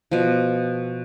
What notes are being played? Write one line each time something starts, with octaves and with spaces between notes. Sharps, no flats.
B2 F3